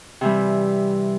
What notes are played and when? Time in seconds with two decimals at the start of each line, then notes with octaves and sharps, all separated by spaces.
0.21 C3 E3 G3